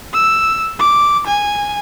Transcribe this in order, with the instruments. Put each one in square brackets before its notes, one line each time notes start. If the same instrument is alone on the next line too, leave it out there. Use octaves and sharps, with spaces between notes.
[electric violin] E6
D6
G#5